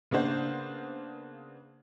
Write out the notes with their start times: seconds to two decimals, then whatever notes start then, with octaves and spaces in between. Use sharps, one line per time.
0.11 C#3 A#3 B3 D4 C5